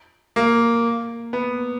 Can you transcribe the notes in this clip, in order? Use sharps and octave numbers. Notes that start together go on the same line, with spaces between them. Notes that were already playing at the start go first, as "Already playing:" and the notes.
A#3
B3